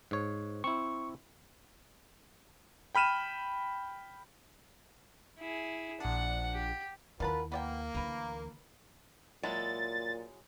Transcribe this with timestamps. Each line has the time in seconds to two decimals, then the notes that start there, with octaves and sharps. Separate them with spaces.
0.11 G#2 C#5
0.64 C4 E4 C#6
2.95 G5 B5 F6 D#7 E7
5.38 E4 G#4
6.00 A#1 D4 F#5
6.53 G4
7.20 D#2 B2 E4 F4 A#4 B4 A5 B5
7.52 A#3 B3 D5 G5
7.95 D2 E3 A#4 B4
9.43 A#2 F#3 G#3 E4 A6